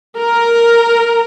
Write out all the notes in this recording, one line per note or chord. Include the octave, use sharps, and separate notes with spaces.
A#4